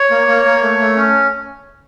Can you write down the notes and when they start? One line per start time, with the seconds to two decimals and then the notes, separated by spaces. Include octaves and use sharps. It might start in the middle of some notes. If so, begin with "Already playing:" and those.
Already playing: C#5
0.11 A#3
0.28 A#3
0.45 A#3
0.62 A3
0.79 A3
0.96 C#4